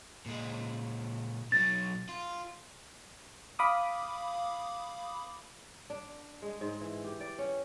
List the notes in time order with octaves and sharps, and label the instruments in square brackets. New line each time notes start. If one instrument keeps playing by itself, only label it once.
[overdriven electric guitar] A#2 G#3
[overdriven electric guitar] B2 F#3 [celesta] A6
[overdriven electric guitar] F4
[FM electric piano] F5 B5 D6 D#6
[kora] D4
G#3
G#2
E3
G4
D5
C#4